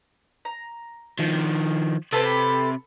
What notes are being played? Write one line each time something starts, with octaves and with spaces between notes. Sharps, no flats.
A#5
D#3 F3
C3 A4 B4 B5